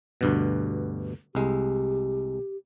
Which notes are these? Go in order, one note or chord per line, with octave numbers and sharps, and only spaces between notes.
D2 G2 B2
C2 G#3 G4